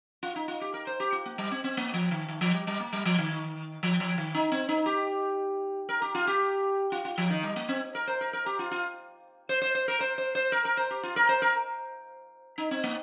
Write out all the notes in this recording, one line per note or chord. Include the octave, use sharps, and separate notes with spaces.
F4
D#4
F4
G4
A#4
C5
G4
F4
A#3
G3
C4
C4
A#3
F3
D#3
D#3
F3
G3
G3
A#3
G3
F3
D#3
F3
F3
D#3
D#4
C4
D#4
G4
A#4
G4
F4
G4
F4
F4
F3
D#3
G3
A#3
C4
A#4
C5
A#4
A#4
G4
F4
F4
C5
C5
C5
A#4
C5
C5
C5
A#4
A#4
C5
G4
F4
A#4
C5
A#4
D#4
C4
A#3